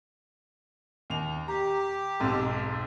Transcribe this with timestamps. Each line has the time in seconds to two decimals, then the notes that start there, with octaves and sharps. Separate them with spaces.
1.10 D#2 F7
1.48 G4 A#5
2.20 B1 F2 G#2